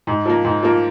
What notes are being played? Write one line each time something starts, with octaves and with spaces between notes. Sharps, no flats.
G#2
F3 A#3
G#2
F3 A#3